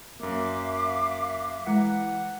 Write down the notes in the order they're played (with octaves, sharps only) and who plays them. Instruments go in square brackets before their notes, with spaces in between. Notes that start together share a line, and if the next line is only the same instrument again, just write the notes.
[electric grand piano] F#2 A#3 [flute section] E5 F5 D6
[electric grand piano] E3 A#5 B6 [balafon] G#3 [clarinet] F#5